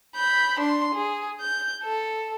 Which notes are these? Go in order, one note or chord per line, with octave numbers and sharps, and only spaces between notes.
B5 G6
D4 C6
G#4
G6
A4